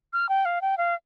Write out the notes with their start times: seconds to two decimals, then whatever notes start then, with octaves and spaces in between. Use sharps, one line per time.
0.13 F6
0.29 G5
0.45 F5
0.62 G5
0.78 F5